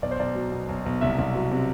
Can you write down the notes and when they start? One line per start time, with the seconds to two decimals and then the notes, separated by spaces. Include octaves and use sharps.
0.02 B1 D5
0.11 C5
0.20 B1 D5
0.35 F#3
0.52 B2
0.69 B1
0.86 B1
1.01 C2 E5
1.18 C2
1.35 F#3
1.51 C3